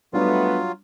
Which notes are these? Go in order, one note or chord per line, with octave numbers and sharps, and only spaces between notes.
F#3 G3 A3 B3 D4 F4